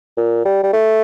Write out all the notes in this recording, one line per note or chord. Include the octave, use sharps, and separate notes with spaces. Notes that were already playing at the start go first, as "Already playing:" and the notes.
A#2
G3
G3
A3